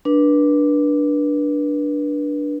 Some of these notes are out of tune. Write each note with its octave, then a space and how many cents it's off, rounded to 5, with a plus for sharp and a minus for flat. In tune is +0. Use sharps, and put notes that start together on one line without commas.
D4 +0 B4 -30